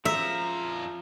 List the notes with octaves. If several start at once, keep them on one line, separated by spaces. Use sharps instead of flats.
F2 F3 E5 A#5